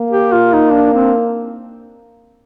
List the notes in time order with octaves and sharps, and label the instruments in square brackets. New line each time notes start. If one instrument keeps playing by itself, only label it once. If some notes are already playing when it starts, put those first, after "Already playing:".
Already playing: [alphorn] A#3
[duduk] G4
F4
D#4
D4
C4